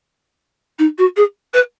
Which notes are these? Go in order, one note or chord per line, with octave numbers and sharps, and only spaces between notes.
D#4
F#4
G#4
B4